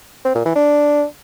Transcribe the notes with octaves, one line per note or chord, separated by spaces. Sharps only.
C4
A#2
E3
D4